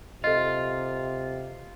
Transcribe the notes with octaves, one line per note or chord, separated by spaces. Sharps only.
C3 F4 A4 D#5